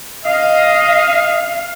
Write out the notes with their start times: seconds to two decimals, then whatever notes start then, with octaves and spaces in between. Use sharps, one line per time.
0.25 D#5 F5